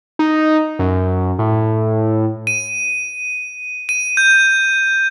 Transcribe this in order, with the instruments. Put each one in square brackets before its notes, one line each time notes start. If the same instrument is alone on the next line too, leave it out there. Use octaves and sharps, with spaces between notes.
[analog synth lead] D#4
F#2
A2
[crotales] D#7
D#7
G6